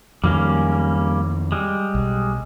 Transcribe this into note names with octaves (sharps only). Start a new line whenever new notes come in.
F2 D#3 F#3 G3 A#3 C#4
G3 G#3
B1